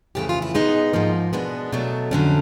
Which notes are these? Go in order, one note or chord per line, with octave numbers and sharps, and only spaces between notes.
F2 C#3 E3 A3 G4
F4
E4
B2 G#3 B3 D#4
G#2 F3 A#3
B2 G#3 B3 D4
B2 F#3 A3
F2 D3 F#3 A3 C#4